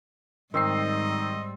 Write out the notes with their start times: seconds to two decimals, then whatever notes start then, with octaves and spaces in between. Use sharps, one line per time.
0.54 G#2 D#3 G3 C4 D#4 D#5 C7